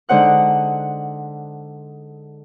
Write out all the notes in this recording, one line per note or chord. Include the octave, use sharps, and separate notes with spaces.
D3 G#3 D#4 C5 F#5 F#6